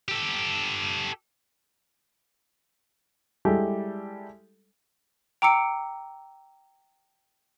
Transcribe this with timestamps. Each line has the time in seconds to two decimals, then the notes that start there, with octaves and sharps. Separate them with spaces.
0.08 G4 A4
3.45 G3 G#3 E4 G4 A4
5.42 G5 A#5 D6 E6 C#7 D7